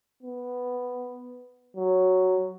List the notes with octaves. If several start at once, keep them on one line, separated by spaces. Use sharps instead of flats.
B3
F#3